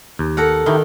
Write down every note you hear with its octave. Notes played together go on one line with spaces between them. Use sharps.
D#2
A4 A#4 F#5
D#3 D#4 E4 G4